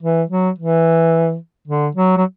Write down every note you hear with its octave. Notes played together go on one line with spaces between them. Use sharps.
E3
F#3
E3
D3
F#3
F#3